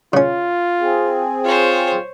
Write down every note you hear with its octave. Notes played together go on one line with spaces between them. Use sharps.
C#3 C#4 F4
C4 G#4
F4 C5 C#5